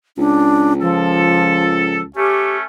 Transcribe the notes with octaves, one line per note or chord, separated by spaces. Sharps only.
C#2 D4
F3 A4
A3 C#4 G4